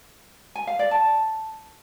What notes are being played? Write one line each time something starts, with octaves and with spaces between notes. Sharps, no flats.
G#5
F5
D5
A5